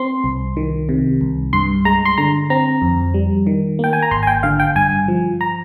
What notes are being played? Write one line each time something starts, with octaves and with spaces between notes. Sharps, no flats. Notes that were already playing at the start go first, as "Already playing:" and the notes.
Already playing: C4 C6
C2
D#3
C3
C2
G2 C6
G#3 A#5
C6
D3 A#5
C4 A#5
F2
G3
D#3
A#3 G5
G#5
A#5
G#1 C6
G#5
G5
D3 F5
G5
G2 G#5
F3
A#5